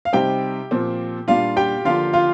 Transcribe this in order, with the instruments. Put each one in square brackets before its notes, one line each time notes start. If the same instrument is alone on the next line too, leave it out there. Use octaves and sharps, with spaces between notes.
[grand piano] F5
[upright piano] C3 G3 C4 D#4 [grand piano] G4 G5
[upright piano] A#2 F3 C4
[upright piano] A#2 G3 D4 [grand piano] F4 F5
[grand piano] G4 G5
[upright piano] D3 F3 A#3 D4 [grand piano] F4 F5
[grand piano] F4 F5